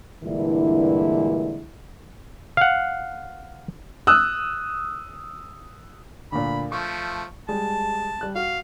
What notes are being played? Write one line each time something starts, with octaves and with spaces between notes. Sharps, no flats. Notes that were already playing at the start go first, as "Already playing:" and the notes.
G2 A#2 D3 E3 G#3 E4
F5 F#5
D#6 E6 F#6
D2 A#2 B5
F3 A3 C#6
G3 G#3 A5
G3 F#6
F#4 F5